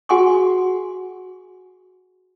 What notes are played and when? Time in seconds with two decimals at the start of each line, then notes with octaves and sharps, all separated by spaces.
0.09 F#4 G#4 F#5 G#5 C6 C#6